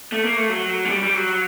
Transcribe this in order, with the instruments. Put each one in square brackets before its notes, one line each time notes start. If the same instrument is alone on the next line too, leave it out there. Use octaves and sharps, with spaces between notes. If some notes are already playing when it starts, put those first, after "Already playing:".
[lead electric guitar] A3
A#3
A3
F#3
A3
G3
G3
F#3